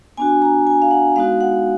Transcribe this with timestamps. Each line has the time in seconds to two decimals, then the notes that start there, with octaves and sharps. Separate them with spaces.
0.17 B3 D4 F#4 G#5
0.42 A#5
0.67 G#5
0.82 F5
0.91 F#5
1.16 G#3 B3 D#4 F#4 F5
1.41 F#5